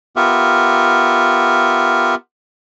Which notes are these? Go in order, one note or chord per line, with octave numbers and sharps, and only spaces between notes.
B3 F4 G4 A#4 E5